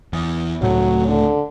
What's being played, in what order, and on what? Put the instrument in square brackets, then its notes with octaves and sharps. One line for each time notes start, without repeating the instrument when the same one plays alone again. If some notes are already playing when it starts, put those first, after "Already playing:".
[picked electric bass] E2
[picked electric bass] C#2 A2 A3 [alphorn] F#3
[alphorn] D3